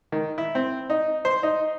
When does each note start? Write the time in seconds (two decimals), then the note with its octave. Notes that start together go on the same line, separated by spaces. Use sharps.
0.12 D#3
0.38 E4
0.55 C4
0.90 D#4
1.25 C5
1.43 D#4